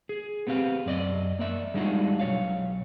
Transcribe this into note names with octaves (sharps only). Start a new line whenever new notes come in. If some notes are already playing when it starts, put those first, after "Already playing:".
G#4
B3 C4 G4 F5
F#2 D5 D#5
A#3 D5 E5
G3 G#3 D4 D#4 F4 F#4
B1 F2 C#5 F5